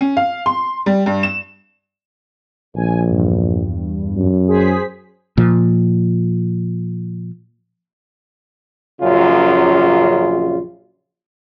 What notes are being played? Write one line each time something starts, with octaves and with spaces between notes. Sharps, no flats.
C#4
F5
C6
G3
G2
E7
A#1 G#5
E2 G2
F#2
G#4 C5 B6
A#2 F3
A#1 F#2 C#3 F4